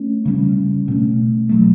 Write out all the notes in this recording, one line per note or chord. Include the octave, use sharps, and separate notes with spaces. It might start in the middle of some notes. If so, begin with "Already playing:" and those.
Already playing: A3 C#4
C#3 G3 C#4
B2 A3 C#4
B2 F#3 A3